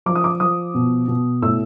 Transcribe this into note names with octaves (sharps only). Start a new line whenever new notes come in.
F3 D6
D#6
D6
F3 D#6
B2
B2
A2 E6